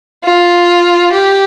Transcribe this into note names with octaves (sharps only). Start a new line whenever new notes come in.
F4
G4